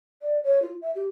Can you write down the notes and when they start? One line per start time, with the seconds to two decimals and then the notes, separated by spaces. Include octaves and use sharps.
0.22 D5
0.44 C#5
0.62 F4
0.82 E5
0.95 G4